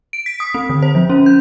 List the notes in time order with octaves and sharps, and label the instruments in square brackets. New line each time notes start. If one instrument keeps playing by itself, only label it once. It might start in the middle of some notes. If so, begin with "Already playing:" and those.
[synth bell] D7
B6
D#6
C4
D3
C5
F3
C#4
G6